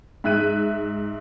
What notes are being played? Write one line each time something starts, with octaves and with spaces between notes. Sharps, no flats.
G#2 E5 F#6 D#7